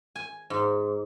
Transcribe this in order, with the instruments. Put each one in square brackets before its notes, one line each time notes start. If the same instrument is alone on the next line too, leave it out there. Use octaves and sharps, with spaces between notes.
[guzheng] G#5
G#2